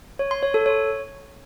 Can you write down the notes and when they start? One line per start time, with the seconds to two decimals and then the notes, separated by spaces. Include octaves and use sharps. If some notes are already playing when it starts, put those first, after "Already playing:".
0.19 C#5
0.31 C6
0.43 C#5
0.54 A4
0.66 C#5